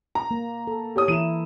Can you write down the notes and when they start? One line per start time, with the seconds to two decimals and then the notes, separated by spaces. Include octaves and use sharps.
0.15 A#5
0.31 A#3
0.67 A4
0.96 G4 C#5 D#6
1.08 E3 E4 D#7 E7